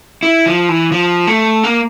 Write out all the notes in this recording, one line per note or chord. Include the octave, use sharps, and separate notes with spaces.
E4
F3
E3
F3
A3
A#3